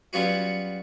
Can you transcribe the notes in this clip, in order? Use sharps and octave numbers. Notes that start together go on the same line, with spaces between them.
F#3 G3 B3 C#4 F4 F#4